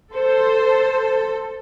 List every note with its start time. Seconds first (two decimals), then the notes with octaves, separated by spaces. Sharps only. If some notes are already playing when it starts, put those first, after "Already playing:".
0.14 A4 C5